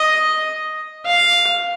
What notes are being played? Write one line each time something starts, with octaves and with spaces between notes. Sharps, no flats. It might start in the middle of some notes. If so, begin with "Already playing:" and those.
Already playing: D#5
F5